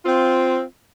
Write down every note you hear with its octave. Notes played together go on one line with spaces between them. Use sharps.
C4 F4